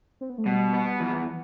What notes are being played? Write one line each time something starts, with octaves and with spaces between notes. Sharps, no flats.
C4
B3
A3
B2 G3
B3
E2 F3
E3